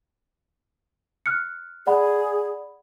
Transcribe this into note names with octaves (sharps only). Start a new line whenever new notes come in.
F6 F#6 C#7
G#4 D5 F#5 B5